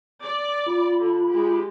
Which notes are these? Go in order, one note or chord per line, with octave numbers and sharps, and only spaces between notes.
D5
F4 B5
D3
G#3 G4